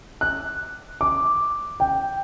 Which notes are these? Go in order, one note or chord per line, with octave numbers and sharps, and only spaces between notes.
F#6
D6
G5